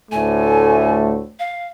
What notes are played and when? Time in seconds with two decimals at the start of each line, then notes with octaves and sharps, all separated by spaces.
0.12 D2 A2 A3 G#5
1.39 F5